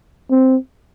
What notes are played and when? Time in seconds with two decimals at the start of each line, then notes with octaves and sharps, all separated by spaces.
0.31 C4